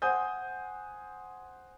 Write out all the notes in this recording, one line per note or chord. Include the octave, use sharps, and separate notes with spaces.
C5 F#5 G#5 D#6 G6